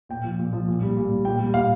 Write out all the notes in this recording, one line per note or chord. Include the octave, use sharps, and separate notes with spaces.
A#2 G5
F3
A#2
F3
A#2
G3
A#2
G3
A#2 G5
G3
A#2 F5